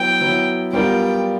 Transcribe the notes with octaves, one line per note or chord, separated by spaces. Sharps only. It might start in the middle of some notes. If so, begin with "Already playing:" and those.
Already playing: F#3 B3 E4 G5
F#3 B3 E4
G3 B3 D4 F4 A#4 G5